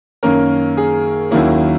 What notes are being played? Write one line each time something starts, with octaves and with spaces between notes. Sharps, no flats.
F#2 D#3 A#3 C#4 A#4
G#4
D#2 D#3 F#3 A#3 C#4 E4